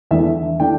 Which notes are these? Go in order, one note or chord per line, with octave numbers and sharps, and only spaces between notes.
E2 E3 A3 D4 E5
E3 A3 D4 G5